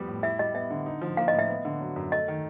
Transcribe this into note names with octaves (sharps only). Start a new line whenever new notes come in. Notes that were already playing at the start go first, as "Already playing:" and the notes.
Already playing: F2 G3 B3
A2
E4 E5
G3 D#5
B3 E5
D3
D#4
F3
A#3 F5
A2 D#5
E5
B3
D3
F#3
F#2
A3 D#5
D#3